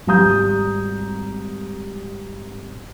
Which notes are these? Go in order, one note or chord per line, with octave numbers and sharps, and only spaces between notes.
G#1 G3 G4 A#5 D#6 G6